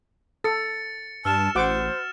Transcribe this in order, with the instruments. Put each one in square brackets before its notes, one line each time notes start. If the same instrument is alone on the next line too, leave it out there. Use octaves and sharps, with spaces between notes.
[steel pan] A4 [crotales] A6 C#7
[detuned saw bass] G2 [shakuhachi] A5 [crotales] E6 F6 E7
[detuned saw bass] A1 [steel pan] F#4 F#5 D6 [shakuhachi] C5